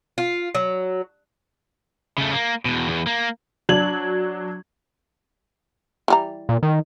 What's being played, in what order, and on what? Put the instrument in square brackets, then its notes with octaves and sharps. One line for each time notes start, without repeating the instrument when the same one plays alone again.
[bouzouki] F4
F#3
[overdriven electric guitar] C#3 A3
A#3
E2 B2
E2
A#3
[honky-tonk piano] F#3 D4 G#6 F#7
[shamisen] E3 G3 A#5
[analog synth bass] A#2
D#3